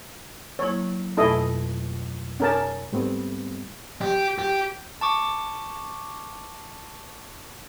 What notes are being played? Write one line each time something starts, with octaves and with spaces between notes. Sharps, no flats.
F#3 A#3 E4 C#5
F2 B2 A3 E4 A4 D#5
C#4 A#4 A5
G#2 G3 A3 B3 C4
G4
G4
A5 C#6 D6